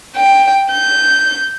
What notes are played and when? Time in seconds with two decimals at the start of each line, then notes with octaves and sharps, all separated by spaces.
0.16 G5
0.72 G6